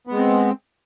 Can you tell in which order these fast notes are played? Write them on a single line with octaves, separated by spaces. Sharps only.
B3 G#3 C4